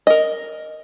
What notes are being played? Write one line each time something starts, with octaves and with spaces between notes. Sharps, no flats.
A#4 D#5